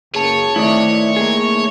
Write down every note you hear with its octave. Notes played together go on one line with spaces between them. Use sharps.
F#1 C#2 A#3 G#4 C#5 A5
D#3 A3 C4 D#4 E4 D5
A#3 G#4